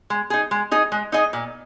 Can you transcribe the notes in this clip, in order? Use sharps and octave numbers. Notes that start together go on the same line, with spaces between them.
G#3
D#4 G#4
G#3
D#4 G#4 D#5
G#3
D#4 G#4 D#5
A#2